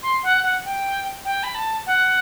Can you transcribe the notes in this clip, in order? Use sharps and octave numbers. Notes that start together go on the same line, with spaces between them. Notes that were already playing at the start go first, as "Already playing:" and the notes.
C6
F#5
F#5
G5
G5
B5
A5
F#5